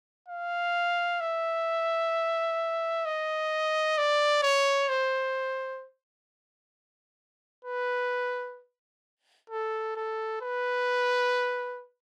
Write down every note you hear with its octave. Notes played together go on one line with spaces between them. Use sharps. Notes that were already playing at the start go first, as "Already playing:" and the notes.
F5
E5
D#5
D5
C#5
C5
B4
A4
A4
B4